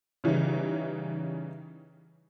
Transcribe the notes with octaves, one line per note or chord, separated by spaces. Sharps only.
C#3 E3 G3 C#4 D#4